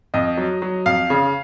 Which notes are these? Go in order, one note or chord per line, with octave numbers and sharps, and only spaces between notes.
F2 D#5
F#3
F#3
F2 F5
C#3